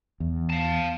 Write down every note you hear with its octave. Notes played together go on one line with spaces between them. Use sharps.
E2
F5 A5